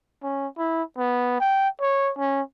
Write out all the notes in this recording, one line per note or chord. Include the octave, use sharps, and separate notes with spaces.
C#4
E4
B3
G5
C#5
C#4